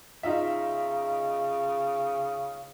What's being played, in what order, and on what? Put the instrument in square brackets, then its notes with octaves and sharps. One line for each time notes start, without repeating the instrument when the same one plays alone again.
[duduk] C#3 [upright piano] D#4 F4 E5